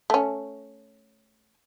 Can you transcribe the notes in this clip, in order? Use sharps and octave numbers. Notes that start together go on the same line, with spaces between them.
A3 C#4